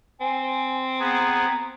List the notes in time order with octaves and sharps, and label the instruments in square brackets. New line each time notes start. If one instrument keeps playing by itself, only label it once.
[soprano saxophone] C4 [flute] G#5
[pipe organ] B3 G#4 [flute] A#5